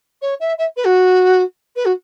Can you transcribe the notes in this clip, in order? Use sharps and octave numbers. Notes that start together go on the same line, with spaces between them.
C#5
E5
E5
B4
F#4
B4
F#4